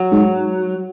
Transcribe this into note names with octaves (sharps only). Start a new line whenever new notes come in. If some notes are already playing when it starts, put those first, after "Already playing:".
Already playing: F#3
G#2